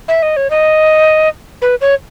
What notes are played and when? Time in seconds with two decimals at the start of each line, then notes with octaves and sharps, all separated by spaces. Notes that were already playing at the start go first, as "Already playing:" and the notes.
0.08 E5
0.23 D#5
0.37 C#5
0.50 D#5
1.62 B4
1.81 C#5